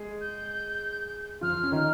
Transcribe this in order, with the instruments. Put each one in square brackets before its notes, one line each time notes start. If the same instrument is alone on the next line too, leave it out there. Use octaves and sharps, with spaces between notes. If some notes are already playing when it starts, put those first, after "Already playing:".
Already playing: [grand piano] G#3 G#4
[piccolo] G6
[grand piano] F3 F4 [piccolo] F6
[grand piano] C#4
D#3 D#4